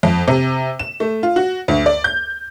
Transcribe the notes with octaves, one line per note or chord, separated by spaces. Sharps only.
F2
C3
E7
A3
F4
F#4
D2
D5
G6